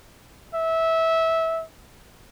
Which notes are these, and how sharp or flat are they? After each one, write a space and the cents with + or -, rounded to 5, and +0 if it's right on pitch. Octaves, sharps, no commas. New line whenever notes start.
E5 -20